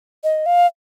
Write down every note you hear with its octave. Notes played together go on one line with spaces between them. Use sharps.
D#5
F5